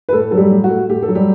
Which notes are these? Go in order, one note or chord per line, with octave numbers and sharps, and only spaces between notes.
B4
A2 A3 A4
F#3 A4
G3 G4
A2
F#4
A3
A2 G4
A4
F#3
G3 G4